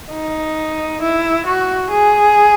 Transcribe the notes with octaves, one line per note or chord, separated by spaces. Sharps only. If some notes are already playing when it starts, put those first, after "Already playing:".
D#4
E4
F#4
G#4